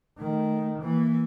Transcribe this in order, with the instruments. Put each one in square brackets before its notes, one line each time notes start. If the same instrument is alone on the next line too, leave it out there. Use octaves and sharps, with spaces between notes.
[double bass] D#3 [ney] A3
[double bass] E3 [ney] A#3